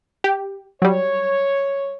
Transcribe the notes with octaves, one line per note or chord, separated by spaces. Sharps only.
G4
F#3 G3 C#5